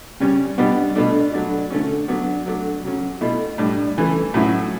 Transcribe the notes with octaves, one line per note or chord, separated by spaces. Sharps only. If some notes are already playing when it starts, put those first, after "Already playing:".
C#3 G3 C#4
B2 G3 B3 D4
B2 A3 D4
F#3 A3 D4
D3 A3 C#4
F#3 B3 D4
F#3 A3 D4
C#3 F#3 C#4
B2 A3 E4
A2 G3 D4
C#3 E3 A3
A2 F#3 C#4 E4